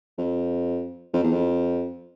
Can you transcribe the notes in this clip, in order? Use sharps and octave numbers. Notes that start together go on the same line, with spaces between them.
F2
F2
E2
F2